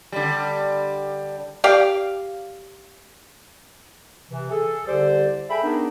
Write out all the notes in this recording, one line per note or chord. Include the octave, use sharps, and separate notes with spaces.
D3 G3
G4 D5 F5
C3 E3
G#4 A4
C2 D3 G4 C5 D5
G#4 A4 E5 G5 B5
B3 D4 D#4 G#4 A#4